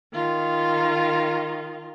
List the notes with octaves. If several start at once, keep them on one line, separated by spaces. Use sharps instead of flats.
D#3 F4